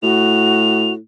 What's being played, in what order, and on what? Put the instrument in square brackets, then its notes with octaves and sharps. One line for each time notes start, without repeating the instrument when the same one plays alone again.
[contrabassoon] A2 [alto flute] F#4 [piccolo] F7